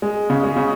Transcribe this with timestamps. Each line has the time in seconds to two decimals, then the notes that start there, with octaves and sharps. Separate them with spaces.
0.02 G#3
0.30 C#3
0.43 G#3
0.56 C#3